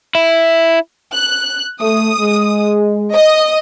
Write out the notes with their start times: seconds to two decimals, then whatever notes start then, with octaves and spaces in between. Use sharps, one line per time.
0.15 E4
1.13 F#6
1.81 A3 D#6
2.19 G#3
3.12 D#5 D#6